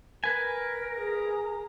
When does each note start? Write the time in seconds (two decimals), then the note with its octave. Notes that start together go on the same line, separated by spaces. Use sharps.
0.24 A#4 B4 G#5
0.96 G#4 A#5